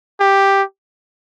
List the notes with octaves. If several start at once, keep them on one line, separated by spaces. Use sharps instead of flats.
G4